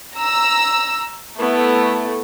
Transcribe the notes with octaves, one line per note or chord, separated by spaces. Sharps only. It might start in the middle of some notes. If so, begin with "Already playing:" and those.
A#5 E6
A3 B3 E4